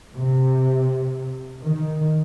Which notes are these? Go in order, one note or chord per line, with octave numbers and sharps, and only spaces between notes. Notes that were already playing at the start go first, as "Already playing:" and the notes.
C3
D#3